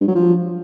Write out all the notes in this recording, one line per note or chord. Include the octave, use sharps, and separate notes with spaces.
G2
F#3
F3